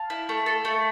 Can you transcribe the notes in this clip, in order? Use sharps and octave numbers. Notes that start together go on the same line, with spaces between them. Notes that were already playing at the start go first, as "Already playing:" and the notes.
Already playing: F5 A5
E4
A3
A4
A3